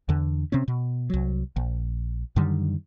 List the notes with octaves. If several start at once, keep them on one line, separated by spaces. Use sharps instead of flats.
E2 D3
C3 C4 C#4
B2
C2 F#3
A#1
F#2 D3 D#3 G3